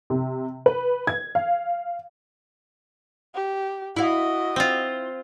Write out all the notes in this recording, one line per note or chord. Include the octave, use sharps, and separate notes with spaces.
C3
B4
G#6
F5
G4
E4 F#4 D#5 F5
C4 F4